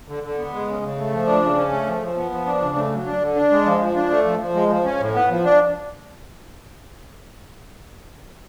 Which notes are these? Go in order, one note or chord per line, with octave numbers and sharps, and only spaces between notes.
D3
D3
B3
G#3
C#3
C#3
A3
F3
D4
C#3
C#4
A3
F3
F3
B3
F3
D4
C#3
A3
F#3
D4
D3
D4
G#3
F3
F3
D4
A3
F3
F3
G#3
F3
C#4
A2
B3
F3
D4